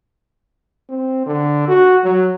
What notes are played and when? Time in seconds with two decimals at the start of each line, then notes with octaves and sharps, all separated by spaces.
0.90 C4
1.26 D3
1.68 F#4
2.04 F#3